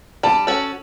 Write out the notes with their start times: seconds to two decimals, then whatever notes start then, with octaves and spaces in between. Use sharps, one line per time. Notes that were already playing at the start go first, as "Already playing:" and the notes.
0.23 G3 A5
0.47 C#4 F#4 A4